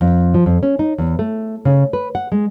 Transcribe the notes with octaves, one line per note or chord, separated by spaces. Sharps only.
F2
F3
F2
C#4
D#4
E2
A3
C#3
B4
F#5
G#3